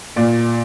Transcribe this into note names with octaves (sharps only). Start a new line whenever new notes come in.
A#2 D5